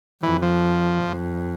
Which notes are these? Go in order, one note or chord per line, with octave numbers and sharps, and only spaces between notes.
F2 E3
F3
F2